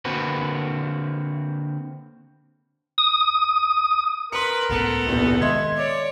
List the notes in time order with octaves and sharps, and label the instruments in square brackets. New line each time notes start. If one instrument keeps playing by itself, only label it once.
[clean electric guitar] D3 A#3 C4 F#4 B4
[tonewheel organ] D#6
[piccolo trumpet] A#4 [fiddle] B4 [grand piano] C6 C#7
[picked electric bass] C#2 A2 C#3 [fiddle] B3 A4
[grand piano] F1 A#1 E2
[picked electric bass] D#3 G#3 [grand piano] D#5 E5 C6 [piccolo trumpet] G#6
[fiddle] C#5 [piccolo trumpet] D5